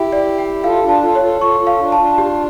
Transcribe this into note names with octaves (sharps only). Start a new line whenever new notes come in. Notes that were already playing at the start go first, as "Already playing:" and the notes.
Already playing: E4 G4
D5
G5
F4 A4 F5
D4 F4
A5
F4 A4
C#5
F4 A4
F4 A4 C#6
F4 A4
F5
D4 F4
A5
D4 F4
G4